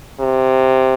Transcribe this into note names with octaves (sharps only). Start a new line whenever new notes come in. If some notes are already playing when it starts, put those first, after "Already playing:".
C3